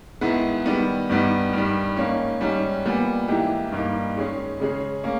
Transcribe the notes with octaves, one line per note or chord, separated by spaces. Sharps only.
G#2 D#3 G#3 B3 E4
D#3 G3 B3
G2 G3 B3 D#4
G2 D#3 G3
G#2 D#3 A#3 C#4
G#2 G3 C#4
A#2 G3 B3
G#2 E3 A#3 E4 G4
G2 G3 A#3 D#4
D#3 G#3 C#4 G#4
C#3 G#3 C#4 G#4
A#3 C#4